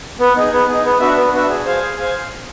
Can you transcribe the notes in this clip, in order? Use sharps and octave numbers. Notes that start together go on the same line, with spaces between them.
B3
D#4 G#4
B3
D#4 G#4
B3
D4 F#4 B4 E5
B3
D4 F#4 B4 E5
G#4
C5 F5 G#5
G#4
C5 F5 G#5